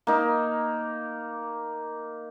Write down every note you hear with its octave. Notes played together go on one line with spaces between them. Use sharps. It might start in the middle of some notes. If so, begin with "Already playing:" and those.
A#3 D#4